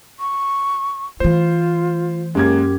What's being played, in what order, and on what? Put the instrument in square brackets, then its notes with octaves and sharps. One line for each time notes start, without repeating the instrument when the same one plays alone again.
[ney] C#6
[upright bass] E3 A3 [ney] F4 [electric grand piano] C5
[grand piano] F#2 G#6 [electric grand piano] G#3 A#3 C#4 [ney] G4